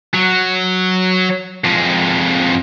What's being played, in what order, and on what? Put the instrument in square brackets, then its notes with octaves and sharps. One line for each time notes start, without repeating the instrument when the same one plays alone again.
[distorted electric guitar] F#3
F2 G#3